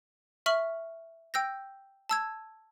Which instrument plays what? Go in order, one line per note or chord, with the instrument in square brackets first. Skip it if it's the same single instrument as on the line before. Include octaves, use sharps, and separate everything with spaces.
[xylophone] E5 C#6 F6 F#7
G5 E6 G6 A#6
A5 E6 G#6